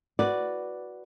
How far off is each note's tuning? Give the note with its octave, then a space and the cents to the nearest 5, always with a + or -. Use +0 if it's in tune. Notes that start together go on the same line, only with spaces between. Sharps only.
F#4 +0 B4 +0 D5 +0